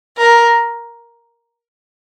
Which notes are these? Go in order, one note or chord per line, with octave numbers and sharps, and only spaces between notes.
A#4